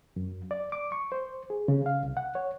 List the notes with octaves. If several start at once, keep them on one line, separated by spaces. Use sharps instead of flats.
F#2
D5
D6
C#6
C5
G#4
C#3
F5
C2
F#5
C#5